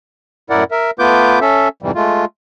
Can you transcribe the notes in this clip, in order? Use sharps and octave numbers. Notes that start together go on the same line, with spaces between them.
F#2 A2 E4 A#4 D5 F#5
A#4 E5
A3 B3 F4 B4 D6 G6
C#4 A4 E5
F2 G#2 C3 E3 G3
G#3 A3 F4